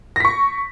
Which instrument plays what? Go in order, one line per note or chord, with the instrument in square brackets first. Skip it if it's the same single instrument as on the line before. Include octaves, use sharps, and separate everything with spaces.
[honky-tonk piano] A#6
B6
C#6